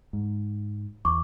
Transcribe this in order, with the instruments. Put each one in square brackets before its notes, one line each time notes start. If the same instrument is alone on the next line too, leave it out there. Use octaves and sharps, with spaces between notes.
[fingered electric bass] G#2
[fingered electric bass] E2 [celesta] C#6 D6